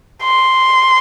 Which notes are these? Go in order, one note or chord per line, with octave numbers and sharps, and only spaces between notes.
C6